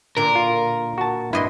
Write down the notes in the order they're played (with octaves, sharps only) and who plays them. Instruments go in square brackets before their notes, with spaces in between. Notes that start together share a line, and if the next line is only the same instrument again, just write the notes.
[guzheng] A#2 D3 [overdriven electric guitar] A#4
[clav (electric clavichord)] F4
F#4 A5
[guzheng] G2 D#5 C6 [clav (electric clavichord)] E4